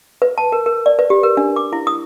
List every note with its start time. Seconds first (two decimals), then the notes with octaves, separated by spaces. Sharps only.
0.22 B4
0.38 A5
0.52 A#4
0.66 A#4
0.86 D5
0.99 B4
1.10 G4
1.23 A#4
1.37 D4
1.56 D6
1.73 E4
1.87 D#6